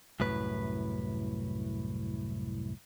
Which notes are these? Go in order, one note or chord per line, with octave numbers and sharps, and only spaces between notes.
C2 F#2 A2 B4